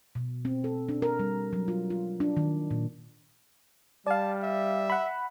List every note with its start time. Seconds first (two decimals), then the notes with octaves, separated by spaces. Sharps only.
0.15 B2
0.45 C4
0.64 A4
0.89 D4
1.02 A#4
1.19 G3
1.53 F#3
1.68 F4
1.90 F4
2.20 D4
2.36 D#3
2.71 A#2
4.07 G3 D5 F5 A5
4.43 E5
4.90 F#5 B5